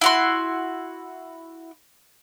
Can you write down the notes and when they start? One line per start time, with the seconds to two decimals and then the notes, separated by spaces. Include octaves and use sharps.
0.01 E4 F#4 C6